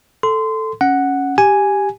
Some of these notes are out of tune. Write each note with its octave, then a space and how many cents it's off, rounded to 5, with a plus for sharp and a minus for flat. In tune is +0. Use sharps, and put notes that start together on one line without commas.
A4 +0 C6 -20
C#4 +0 F#5 +0
G4 +0 G#5 +0